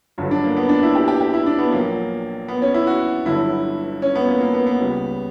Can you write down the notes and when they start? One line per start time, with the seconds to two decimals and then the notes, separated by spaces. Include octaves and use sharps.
0.18 G1 G2 D3 F#3
0.31 D4
0.44 A#3
0.57 B3
0.69 D4
0.83 E4
0.95 G4
1.08 G4
1.21 G4
1.34 E4
1.46 D4
1.59 B3
1.72 A#1 A#2 F#3 A#3
2.48 B3
2.62 C#4
2.74 E4
2.87 F#4
3.25 G1 G2 D3 F#3 E4
4.02 C#4
4.15 B3
4.28 A#3
4.41 A#3
4.54 B3
4.67 B3
4.79 C#2 C#3 G3